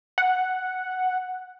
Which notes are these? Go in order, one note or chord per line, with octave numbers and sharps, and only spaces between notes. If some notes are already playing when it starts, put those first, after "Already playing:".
F#5